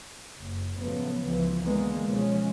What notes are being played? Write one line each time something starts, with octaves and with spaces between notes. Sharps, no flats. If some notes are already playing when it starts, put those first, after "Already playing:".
F#1
A2 C#3 F3 F#3 A3 B3
C#2 E3 F3
D3 E3 G#3 A#3 B3
B2 F3 G#3 C#4